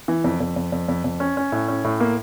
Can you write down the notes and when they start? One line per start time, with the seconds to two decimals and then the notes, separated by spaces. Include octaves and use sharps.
0.08 E3
0.24 F2
0.40 F2
0.56 F2
0.72 F2
0.88 F2
1.04 F2
1.20 C#4
1.37 C#4
1.52 A2
1.68 C#4
1.84 A2
2.00 A#3